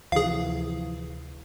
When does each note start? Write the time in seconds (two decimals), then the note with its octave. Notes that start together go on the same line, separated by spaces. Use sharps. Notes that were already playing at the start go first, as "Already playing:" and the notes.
0.12 D2 C3 E3 F3 G#4 F5